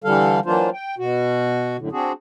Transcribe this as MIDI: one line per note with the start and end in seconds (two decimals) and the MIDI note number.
0.04 0.40 50
0.04 0.40 52
0.04 0.40 55
0.04 0.40 69
0.04 0.40 77
0.46 0.70 52
0.46 0.70 54
0.46 0.70 58
0.46 0.70 62
0.46 0.70 65
0.46 0.70 72
0.73 0.95 79
0.98 1.77 47
0.98 1.77 66
1.79 1.89 42
1.79 1.89 45
1.79 1.89 50
1.92 2.12 60
1.92 2.12 62
1.92 2.12 66
1.92 2.12 68